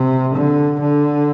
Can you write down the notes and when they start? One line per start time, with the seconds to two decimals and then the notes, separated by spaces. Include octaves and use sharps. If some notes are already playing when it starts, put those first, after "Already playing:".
Already playing: C3
0.36 D3
0.81 D3